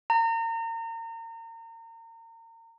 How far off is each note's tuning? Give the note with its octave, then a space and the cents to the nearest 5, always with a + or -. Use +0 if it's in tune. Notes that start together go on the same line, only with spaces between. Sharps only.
A#5 -35